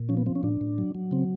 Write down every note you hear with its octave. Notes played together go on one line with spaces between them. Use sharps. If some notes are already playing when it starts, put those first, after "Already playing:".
Already playing: A#2
F3 C#4
B3
F3 C4
C#4
A2 D4
A2
F#3
F#3
C#3 C4